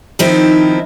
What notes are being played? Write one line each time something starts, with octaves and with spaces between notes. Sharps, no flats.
D#3 F3 C4 D#4 E4